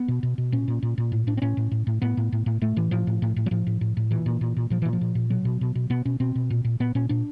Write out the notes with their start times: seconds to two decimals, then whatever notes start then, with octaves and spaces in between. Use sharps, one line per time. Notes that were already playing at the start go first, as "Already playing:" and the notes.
Already playing: B3
0.08 B2
0.23 B2
0.38 B2
0.52 A#2 C#4
0.68 A#2
0.83 A#2
0.98 A#2
1.12 A2
1.27 A2 D4
1.37 C4
1.42 A2 C#4
1.57 A2
1.71 A2
1.87 A2
2.02 A2 B3
2.17 A2
2.32 A2
2.46 A2
2.62 A2 A3
2.76 A2 E3
2.91 A2 F3
3.07 A2
3.22 A2
3.36 A2
3.46 F#3
3.51 A2 F3
3.67 A2
3.81 A2
3.97 A2
4.11 A#2 E3
4.26 A#2
4.41 A#2
4.57 A#2
4.70 A#2 F3
4.82 A#2 E3
4.93 F3
5.01 A#2
5.15 A#2
5.30 B2 F#3
5.45 B2
5.61 B2
5.75 B2
5.90 B2 B3
6.05 B2 C#4
6.20 B2 C4
6.35 B2
6.50 A#2
6.65 A#2
6.80 A#2 B3
6.95 A#2 C#4
7.09 A#2 D4